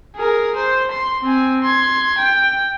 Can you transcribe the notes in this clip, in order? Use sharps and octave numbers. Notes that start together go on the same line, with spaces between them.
G#4 A#4
C5
C6
C4 G#5
C6 G#6
G5